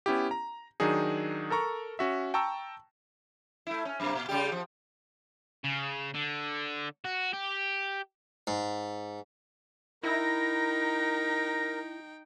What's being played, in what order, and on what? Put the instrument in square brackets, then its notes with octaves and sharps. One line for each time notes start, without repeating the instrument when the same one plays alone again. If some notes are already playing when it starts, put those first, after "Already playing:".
[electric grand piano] B3 C#4 E4 G4
A#5
D#3 F#3 D4 D#4 G#4
A4 A#4 A#5 C#6
C#4 F#4 E5
G5 A5 A#5 C#6 E6
[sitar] A3 E4
C#4
F#2 C3 A#3
A#2
C#3 G3 G4
F3
[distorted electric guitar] C#3
D3
F#4
G4
[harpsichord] G#2
[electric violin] D#4 G5 [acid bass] E4 [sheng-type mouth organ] A#4 [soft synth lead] A#6